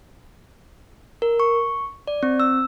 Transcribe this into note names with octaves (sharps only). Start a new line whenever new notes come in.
A#4
C#6
D5
C4
E6